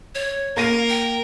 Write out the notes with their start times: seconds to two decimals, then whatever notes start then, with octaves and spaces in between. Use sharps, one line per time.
0.15 C#5
0.57 A#3 A#4 F5 A#6 D#7
0.89 G5